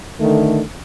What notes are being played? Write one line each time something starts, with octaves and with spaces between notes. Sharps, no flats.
D3 D#3 A3